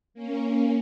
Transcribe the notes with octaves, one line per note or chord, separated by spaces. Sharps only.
A#3 C#4